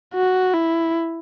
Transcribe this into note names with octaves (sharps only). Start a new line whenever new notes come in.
F#4
E4